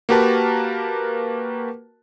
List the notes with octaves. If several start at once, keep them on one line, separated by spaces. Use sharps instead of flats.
A#3 F#4 G4 A#4 B4 A5